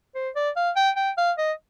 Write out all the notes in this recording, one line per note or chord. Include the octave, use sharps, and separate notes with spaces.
C5
D5
F5
G5
G5
F5
D#5